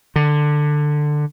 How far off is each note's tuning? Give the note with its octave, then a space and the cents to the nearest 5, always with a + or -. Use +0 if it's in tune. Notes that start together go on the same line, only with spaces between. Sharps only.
D3 +15